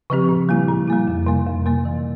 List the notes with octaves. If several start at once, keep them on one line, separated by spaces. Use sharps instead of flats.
C#3 F3 C4 G4
A#2
G3 A#3 E4
A#2
G3 A#3 E4
F2
C3 G3 A#3
F2
C3 G3 A#3
E3